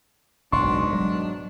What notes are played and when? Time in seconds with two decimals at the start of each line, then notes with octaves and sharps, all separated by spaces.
0.52 F#1 B1 G#2 B2 D#3 D4 C6 C#6
0.93 F#3 G#3